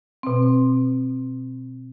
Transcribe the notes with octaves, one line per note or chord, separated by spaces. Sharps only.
B2 C4